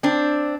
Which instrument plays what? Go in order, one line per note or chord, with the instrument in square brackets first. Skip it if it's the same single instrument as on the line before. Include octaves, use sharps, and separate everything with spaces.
[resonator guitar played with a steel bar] C4 D4